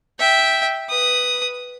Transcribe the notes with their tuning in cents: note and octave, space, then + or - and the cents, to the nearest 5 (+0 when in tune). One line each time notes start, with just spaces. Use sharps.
E5 -10 G5 +0
B4 +0 D#6 +0